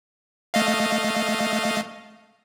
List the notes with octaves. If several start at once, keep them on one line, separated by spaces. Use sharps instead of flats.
A3 D#5 F5